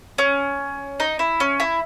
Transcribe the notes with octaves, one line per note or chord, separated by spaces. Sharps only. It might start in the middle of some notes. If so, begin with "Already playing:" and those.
C#4
D#4
E4
C#4
E4